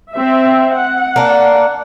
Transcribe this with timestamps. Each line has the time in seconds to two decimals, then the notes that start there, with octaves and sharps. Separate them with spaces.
0.13 C4 E5
0.74 F#5
1.16 A#3 D4